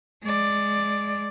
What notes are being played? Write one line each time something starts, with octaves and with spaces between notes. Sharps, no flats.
G#3 D5